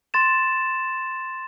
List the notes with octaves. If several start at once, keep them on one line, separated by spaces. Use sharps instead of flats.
C6 A6 E7